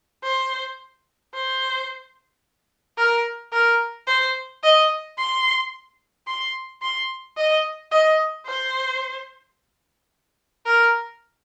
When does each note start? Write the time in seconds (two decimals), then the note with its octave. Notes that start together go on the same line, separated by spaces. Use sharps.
0.24 C5
1.34 C5
2.98 A#4
3.53 A#4
4.08 C5
4.63 D#5
5.18 C6
6.27 C6
6.82 C6
7.37 D#5
7.92 D#5
8.46 C5
10.66 A#4